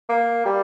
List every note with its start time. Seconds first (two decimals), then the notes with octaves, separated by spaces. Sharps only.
0.09 A#3
0.45 G3